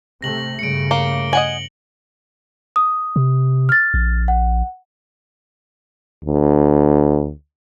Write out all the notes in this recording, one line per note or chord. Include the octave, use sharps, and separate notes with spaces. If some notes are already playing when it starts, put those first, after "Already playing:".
C3 A3 A#6 F#7
G2 C#3 A3 C#7 D7
A#3 G7
D#5 F#5 G#5 F#7
D#6
C3
F6 A6
A#1
F#5
D2